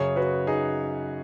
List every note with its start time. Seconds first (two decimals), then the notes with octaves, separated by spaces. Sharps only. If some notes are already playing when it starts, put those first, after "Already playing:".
Already playing: F#2 C#3 G#4 C#5
0.16 F#4 B4
0.47 D#4 G#4